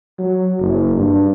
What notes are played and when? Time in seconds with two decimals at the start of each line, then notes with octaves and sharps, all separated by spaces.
0.19 F#3
0.59 F#1
0.97 G2